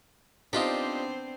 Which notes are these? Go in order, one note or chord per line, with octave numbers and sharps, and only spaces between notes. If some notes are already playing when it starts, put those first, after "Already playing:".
B3 C4 D4 D#4 F4 G4 C5